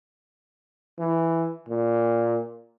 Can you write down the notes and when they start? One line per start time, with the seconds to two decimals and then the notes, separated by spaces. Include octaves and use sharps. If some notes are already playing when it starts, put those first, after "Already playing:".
0.99 E3
1.69 A#2